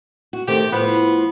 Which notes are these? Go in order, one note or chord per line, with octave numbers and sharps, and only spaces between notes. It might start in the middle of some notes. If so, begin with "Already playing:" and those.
F#4
C3 D#3 A3 G4
A2 F3 B3